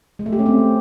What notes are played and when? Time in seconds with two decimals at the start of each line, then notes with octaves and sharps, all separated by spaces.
0.19 G#3
0.26 A3
0.33 G4
0.39 C#4
0.46 C4